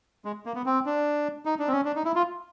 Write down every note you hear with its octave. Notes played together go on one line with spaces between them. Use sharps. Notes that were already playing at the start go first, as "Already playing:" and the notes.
G#3
A#3
B3
C4
D4
D#4
D4
C4
C#4
D4
D#4
E4
F4